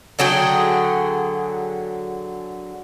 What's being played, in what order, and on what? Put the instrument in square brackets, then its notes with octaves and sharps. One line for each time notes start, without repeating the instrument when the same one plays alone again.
[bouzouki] D3 F#3 G#4 G5